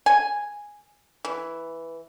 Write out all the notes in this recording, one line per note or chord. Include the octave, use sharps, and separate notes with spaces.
G#5
E3